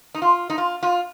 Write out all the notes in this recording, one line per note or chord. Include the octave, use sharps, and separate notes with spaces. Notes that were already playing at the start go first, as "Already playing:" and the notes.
D#4
F4
D#4
F4
F4